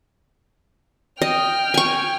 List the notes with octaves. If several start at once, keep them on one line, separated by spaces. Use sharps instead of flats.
D#5 G5 F6
G#5 C#6